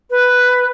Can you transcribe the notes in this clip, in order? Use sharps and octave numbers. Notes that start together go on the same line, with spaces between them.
B4